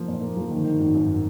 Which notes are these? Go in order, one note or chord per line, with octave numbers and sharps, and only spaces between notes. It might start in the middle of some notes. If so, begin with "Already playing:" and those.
Already playing: F3 A#3 F4
A#2
A#3
F3
D#3
D#3
G#1
F#2